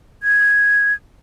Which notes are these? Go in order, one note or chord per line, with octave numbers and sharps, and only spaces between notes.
G#6